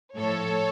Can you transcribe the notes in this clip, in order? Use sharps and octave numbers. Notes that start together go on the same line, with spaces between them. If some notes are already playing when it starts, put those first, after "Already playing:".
A2 F3 A4 C#5